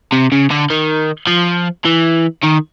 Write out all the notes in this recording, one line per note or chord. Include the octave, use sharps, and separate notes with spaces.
C3
C#3
D3
D#3
F3
E3
D#3